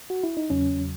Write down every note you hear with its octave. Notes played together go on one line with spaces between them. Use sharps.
F#4
E4
D#4
E2 C#3 F#3 C#4